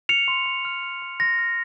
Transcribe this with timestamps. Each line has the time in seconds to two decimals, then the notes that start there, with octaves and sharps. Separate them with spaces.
0.09 F6 C#7 F7
0.28 C6
0.46 C6
0.65 F6
0.83 F6
1.02 C6
1.20 C6 A#6
1.38 F6